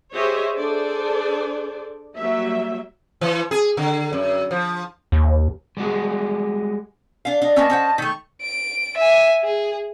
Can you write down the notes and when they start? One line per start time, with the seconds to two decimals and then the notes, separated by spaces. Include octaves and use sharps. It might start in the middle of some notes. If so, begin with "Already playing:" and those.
0.14 G4 G#4 C5 C#5 D#5 E5
0.56 D4 G#4 A4 C5 D5
2.16 F#3 G3 A#3 E5
3.21 E3
3.51 G#4
3.77 D3
4.13 F#2
4.51 F3
5.12 D#2
5.77 G3 G#3 F#4 G#4
7.25 D4 F5
7.42 D4 D#5 F5
7.56 A#3 B3 C#4 D#5 A5
7.70 C#4 C5 F#5
7.98 D#3 A3 C#6
8.42 D7
8.97 E5 G#5
9.43 G#4